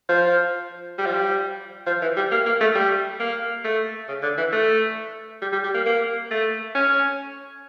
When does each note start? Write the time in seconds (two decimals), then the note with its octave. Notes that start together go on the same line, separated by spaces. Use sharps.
0.09 F3
0.98 G3
1.06 F3
1.13 G3
1.86 F3
2.02 E3
2.17 G3
2.31 A#3
2.46 A#3
2.61 A3
2.75 G3
3.20 A#3
3.64 A3
4.08 C#3
4.23 D3
4.38 E3
4.52 A3
5.42 G3
5.52 G3
5.64 G3
5.74 A#3
5.86 A#3
6.31 A3
6.75 C#4